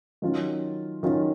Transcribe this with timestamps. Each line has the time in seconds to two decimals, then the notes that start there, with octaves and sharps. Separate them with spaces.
0.22 D#3 F#3 C#4 F4
1.03 D#3 F#3 C#4 F4